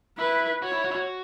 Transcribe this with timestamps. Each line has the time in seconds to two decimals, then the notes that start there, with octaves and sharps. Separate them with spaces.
0.18 E4 B4
0.62 F#4 C#5
0.73 E4
0.85 F#4
0.91 E4
0.95 F#4